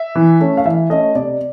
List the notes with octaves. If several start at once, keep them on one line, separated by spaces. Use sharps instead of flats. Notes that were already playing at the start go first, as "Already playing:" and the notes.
Already playing: E5
E3
A3 C#4
F5
E3 E5
A3 C#4 D#5
C3 D5